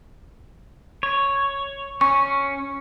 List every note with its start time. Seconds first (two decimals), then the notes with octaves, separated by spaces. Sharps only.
1.03 C#5
2.01 C#4 C#6